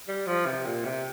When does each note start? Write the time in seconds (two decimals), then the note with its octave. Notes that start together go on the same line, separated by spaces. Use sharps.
0.08 G3
0.27 F3
0.47 C3
0.66 A#2
0.85 C3